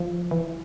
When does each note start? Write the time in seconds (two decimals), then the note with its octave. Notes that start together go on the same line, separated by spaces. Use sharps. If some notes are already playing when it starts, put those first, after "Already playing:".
Already playing: F3
0.31 E3